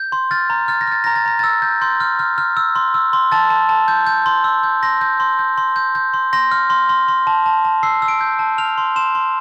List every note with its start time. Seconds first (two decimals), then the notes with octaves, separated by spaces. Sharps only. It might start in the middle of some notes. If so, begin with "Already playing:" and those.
Already playing: G6
0.12 C6
0.31 F6 A6
0.50 A#5
0.68 F6 A6
0.81 A#6
0.87 F6 A6
1.04 A#5 A#6
1.16 A6
1.25 A#5 A#6
1.39 E6 A6
1.62 G6
1.81 C6 G6
2.00 F6
2.19 F6
2.38 F6
2.57 E6
2.75 C6
2.94 E6
3.13 C6
3.32 A5 A6
3.50 A5
3.69 A5
3.88 G6
4.07 G6
4.26 C6
4.44 E6
4.63 G6
4.83 C6 A#6
5.01 G6
5.20 C6
5.39 G6
5.58 C6
5.76 G6
5.95 G6
6.14 C6
6.33 C6 A#6
6.51 F6
6.70 C6
6.89 C6
7.08 C6
7.27 A5
7.46 A5
7.65 A5
7.83 E6 C7
8.02 E6
8.08 D7
8.21 G6
8.39 A5
8.58 F6 F7
8.78 C6
8.96 C6 E7
9.15 C6